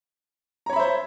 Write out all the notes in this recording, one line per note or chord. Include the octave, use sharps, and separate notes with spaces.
C5 C#5 E5 A#5 B5